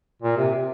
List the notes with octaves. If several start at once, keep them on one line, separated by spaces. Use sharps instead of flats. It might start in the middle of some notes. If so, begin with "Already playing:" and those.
A#2
C3
C3